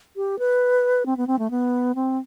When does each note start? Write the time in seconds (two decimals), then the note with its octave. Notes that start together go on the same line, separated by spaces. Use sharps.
0.16 G4
0.39 B4
1.06 C4
1.17 B3
1.27 C4
1.39 A3
1.51 B3
1.95 C4